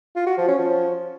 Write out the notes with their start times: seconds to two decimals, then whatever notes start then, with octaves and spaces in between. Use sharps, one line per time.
0.16 F4
0.27 F#4
0.38 F3
0.48 C#4
0.59 F3